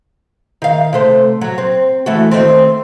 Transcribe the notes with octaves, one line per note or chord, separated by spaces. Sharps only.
D#3 F5
C3 A3 C5
F#3
C4
E3 A3 F#4
D#3 A3 C4